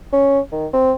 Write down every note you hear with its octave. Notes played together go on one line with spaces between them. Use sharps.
C#4
D#3
C4